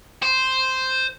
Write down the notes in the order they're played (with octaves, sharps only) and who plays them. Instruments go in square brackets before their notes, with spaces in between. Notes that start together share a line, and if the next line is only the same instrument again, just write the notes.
[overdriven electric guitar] C5